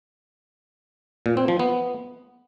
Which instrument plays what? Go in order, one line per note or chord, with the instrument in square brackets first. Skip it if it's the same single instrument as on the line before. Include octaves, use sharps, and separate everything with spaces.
[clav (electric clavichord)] A#2
C4
F3
B3